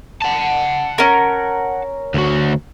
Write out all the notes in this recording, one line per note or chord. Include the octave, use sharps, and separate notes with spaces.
F#5 A5
C#4 A#4
D2 F#4